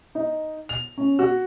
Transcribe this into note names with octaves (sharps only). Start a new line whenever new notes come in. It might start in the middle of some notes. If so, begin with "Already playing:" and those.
D#4
F7
C#4
F#4